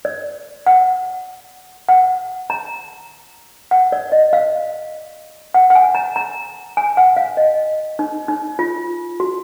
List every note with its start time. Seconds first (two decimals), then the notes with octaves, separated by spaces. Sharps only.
0.05 D5
0.66 F#5
1.89 F#5
2.50 A#5
3.71 F#5
3.92 D5
4.12 D#5
4.33 F5
5.54 F#5
5.70 F#5
5.75 G#5
5.95 A#5
6.16 A#5
6.77 G#5
6.97 F#5
7.17 F5
7.37 D#5
7.99 D#4
8.28 D#4
8.59 F4
9.20 F#4